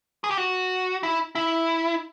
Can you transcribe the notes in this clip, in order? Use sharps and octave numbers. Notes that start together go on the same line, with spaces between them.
G#4
G4
F#4
E4
E4